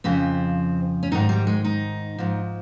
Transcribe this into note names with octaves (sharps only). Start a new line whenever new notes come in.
F2 C#3 F3 C4
C#4
G#2 D#3 D#4
G3
G#3
D#4
G#2 F3